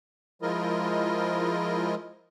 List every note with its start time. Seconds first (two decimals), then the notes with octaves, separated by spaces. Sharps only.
0.42 F3 G#3 E4 F4 A#4 D#5